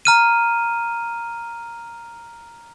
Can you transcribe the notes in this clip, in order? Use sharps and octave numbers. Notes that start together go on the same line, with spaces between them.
A#5 F6 D#7